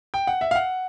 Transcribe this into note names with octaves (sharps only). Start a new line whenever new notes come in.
G5
F#5
E5
F5
F#5